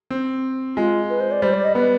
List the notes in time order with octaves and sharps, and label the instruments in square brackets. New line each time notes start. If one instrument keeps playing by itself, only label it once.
[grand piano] C4
[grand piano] G#3 [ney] F4
[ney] B4
C5
D5
[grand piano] G3 [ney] C5
[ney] D5
D#5
[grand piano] B3 [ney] B4